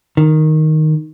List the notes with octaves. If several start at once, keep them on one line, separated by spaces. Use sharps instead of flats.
D#3